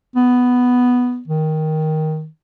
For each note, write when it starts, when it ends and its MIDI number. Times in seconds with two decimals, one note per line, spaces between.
0.16 1.22 59
1.28 2.27 51